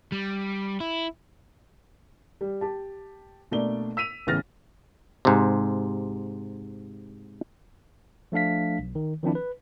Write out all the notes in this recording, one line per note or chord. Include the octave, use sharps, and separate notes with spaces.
G3
E4
G3
G4 A5
B2 A3 A#3 D4 D5 G7
E6 B6 D#7 F7
A1 C#3 B3 F6 A6 A#6
G#2 C3
F3 A3 D4 F5 B6
B1
D#3
D#3 F3 C4 D4 E4
B4